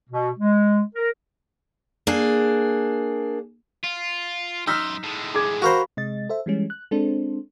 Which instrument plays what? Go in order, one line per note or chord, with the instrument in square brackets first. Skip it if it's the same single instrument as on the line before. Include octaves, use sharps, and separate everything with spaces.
[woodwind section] B2
G#3
A#4
[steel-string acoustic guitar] A#3 D4 G#4
[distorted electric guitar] F4
[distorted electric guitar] F#2 C6 [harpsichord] D#4 [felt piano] E6 F6 B6
[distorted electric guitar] A2 G#3
[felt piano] G#4 D6 G#6
[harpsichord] F#4 A#4 C5 [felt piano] F5 B5
[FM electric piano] C3 G#3 D#5 A6
A4 C5 E5
E3 G3 G#3 C#4
F#6
G#3 C4 D4 A4 C5